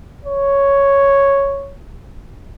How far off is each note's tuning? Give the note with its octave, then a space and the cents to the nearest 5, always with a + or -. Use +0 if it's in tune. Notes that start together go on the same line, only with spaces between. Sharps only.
C#5 +0